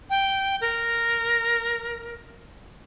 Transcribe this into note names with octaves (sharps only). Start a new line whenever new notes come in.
G5
A#4